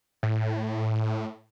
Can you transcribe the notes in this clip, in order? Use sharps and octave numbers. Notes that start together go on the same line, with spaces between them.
A2